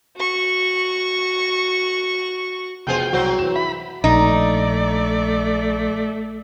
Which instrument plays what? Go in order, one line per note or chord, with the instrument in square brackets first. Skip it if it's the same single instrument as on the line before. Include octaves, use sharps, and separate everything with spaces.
[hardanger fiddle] F#4 C#6
[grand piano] F1 B3 F#4 [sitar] F4 G#4 C5 [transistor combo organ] G5
[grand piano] C2 [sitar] F#3 C4 C5 [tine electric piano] F#4
[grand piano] E3 E7
[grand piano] E4 [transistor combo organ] B5
[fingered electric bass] A#1 [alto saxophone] A3 [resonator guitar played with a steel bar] D#4 [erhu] D5